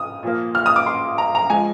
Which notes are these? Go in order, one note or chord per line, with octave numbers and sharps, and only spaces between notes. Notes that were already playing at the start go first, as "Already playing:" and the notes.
Already playing: D#6
A#2 F3 A#3
F6
D#6
D6
C6
A#5
A#5
F3 G#3 G#5